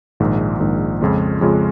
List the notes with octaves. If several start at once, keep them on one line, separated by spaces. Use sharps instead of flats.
A#1 G#2 D#3
A#1 G#2 D#3
F2 C#3 G#3 C#4 F4
F2 C#3 G#3 C#4 F4